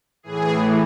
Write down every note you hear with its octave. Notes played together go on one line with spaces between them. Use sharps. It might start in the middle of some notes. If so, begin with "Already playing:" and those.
A2 E3 G#4